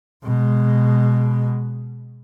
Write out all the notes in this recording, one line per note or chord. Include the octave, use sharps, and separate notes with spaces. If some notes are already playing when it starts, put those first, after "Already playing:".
B2 G#3